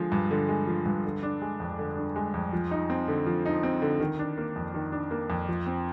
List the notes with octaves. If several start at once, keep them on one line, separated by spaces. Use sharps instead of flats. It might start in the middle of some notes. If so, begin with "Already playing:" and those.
Already playing: D3 F3 G#3
G2
D3
G#3
F3
G2
D3
D4
G#3
F2
D3
D4
G#3
F2
F3
D#4
C4
D3
F3
D#4
C4
D3
D#3
D4
A#3
F2
D#3
D4
A#3
F2
F3
C4